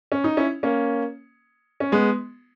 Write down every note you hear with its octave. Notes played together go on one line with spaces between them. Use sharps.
C#4
D#4
C#4 E4
A#3 C#4
C#4
G#3 B3